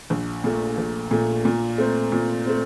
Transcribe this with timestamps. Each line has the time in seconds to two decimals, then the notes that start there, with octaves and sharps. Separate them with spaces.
0.10 A#1
0.44 A#2 A3
0.78 A#1
1.11 A#2 A3
1.45 A#2
1.78 A3 C4
2.12 A#2
2.46 A3 C4